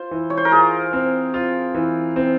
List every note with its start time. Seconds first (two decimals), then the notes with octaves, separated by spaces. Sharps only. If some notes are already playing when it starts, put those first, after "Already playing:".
Already playing: F4 C5
0.11 E3
0.30 C#5
0.37 C5
0.45 A#4
0.52 F4 G#4
0.93 C4
1.34 F4
1.74 E3
2.16 C4